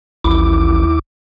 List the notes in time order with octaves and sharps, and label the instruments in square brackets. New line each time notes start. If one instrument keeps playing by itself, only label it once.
[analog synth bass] A1 [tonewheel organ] D#2 E4 D6